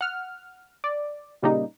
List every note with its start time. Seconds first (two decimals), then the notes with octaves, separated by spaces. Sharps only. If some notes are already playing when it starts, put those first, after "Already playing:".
0.01 F#5 F6
0.84 D5
1.42 A#2 C#3 G3 A#3 D#4